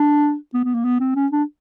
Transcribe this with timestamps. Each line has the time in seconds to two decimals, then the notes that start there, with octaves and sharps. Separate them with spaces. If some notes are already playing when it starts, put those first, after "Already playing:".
Already playing: D4
0.54 B3
0.64 B3
0.75 A#3
0.85 B3
1.00 C4
1.16 C#4
1.32 D4